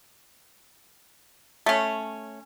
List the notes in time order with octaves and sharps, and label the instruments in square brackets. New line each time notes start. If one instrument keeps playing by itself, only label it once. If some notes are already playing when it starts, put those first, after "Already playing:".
[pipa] A3 C#4